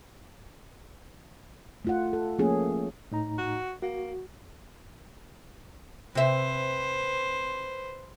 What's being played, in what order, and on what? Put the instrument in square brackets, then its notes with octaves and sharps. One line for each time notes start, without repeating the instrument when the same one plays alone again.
[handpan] A3 F4 F#5
A4
F3 A3 A#3 C#4 G#4
[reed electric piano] A2 D#4 A#5
[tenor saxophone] F#4
[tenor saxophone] A#3 [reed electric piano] F#4
[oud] C3 E5 [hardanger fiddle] B4 C5